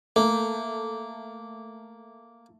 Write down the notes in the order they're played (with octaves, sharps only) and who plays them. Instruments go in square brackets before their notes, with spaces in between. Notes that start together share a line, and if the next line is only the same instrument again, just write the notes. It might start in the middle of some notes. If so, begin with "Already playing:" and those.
[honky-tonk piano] A3 [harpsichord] A#3